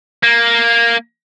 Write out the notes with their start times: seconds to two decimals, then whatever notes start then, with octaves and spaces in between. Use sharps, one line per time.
0.23 A#3